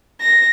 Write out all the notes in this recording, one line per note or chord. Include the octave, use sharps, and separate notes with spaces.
A#6